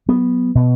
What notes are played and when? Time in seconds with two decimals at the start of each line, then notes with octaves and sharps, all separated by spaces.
0.09 F#3 B3
0.55 B2